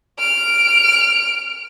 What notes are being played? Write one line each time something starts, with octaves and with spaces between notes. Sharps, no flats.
F6 D7